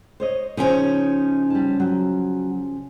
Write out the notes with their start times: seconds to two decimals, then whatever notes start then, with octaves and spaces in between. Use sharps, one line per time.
0.20 C5 C#5 D#5
0.57 C#3 F3 C#4 D#4
1.50 G3 A5
1.80 F#3